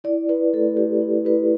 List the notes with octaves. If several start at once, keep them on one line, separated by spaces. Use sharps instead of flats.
E4 D5
E4 B4
A3 A4
A3 G4
E4
E4 B4